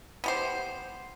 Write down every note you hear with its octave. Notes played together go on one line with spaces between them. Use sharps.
B3 G4 C5